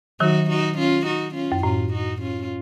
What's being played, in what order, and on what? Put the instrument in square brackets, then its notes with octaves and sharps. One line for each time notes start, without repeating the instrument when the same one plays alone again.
[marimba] D#3 F#3 [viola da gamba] D#4 F#4
[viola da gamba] D#4 F#4
C#4 F4
D#4 F#4
C#4 F4
[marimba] F#2
[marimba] A2 [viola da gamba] C#4 F4
[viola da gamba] D#4 F#4
C#4 F4